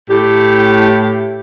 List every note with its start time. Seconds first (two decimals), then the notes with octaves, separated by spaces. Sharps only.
0.10 A2 G4